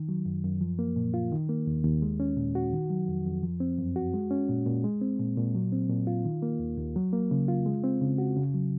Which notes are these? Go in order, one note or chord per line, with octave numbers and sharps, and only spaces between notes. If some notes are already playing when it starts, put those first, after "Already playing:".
Already playing: D#3
F#3
F#2
F#2
F3
A#3
A#2
F4
D#3
A#3
D#2
D#2
G#3
C#4
A#2
F#4
D#3
F#3
F2
F2
F3
C4
F#2
F#4
G#3
C#4
A#2
A#2
G#3
C4
A#2
A#2
F#3
C4
A#2
F4
D#3
A#3
D#2
D#2
F#3
A#3
C#3
F4
G#3
C4
C#3
F#4
C#3
F#3